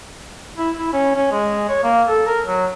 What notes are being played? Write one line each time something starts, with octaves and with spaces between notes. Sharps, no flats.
E4
E4
C#4
C#4
G#3
C#5
A#3
A4
A#4
F#3